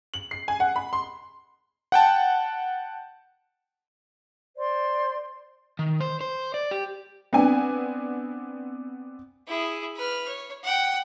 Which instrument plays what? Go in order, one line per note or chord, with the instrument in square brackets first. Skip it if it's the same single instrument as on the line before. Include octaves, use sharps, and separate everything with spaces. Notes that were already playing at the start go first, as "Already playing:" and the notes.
[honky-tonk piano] F#7
C7
G#5
F#5
B5
C6
[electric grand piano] F#5 G5 A5
[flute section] C5 D5 C6
[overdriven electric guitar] D#3
C5
C5
D5
G4
[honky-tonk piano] B3 C4 D4 G#5
[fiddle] E4 G#4
B4 F6
C#5
F#5 G5